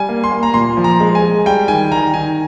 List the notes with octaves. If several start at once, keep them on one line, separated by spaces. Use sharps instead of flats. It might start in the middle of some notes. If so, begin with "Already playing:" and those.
Already playing: G3 G#5
A#3
C6
A#3
A#5
A#2 C6
F3
A#5
G#3
G#5
G#3
G3 G5
D#3 G#5
D#3 A#5
D#3 G#5